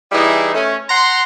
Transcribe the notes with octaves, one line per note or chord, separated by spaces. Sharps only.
E3 G3 D#4 E4 G#4
A3 C#4
F#5 A#5 C6